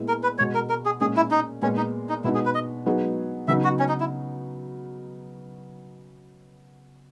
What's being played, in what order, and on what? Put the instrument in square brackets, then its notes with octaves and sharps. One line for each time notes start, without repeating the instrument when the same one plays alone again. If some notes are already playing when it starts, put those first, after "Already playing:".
Already playing: [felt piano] A#2 G#3 B3 E4
[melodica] A#4
B4
[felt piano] B2 G#3 B3 [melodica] C#5
[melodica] A#4
A#4
G#4
[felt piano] A#2 G#3 C#4 [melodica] G#4
[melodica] E4
D#4
[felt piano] A#2 G#3 B3 [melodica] C#4
[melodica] D#4
D#4
[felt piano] B2 G#3 B3 D#4 [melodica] E4
[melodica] G#4
B4
D#5
[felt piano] F#3 B3 D#4 G#4
[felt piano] C#3 F#3 B3 D#4 [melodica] E5
[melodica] F#4
C#4
D#4
E4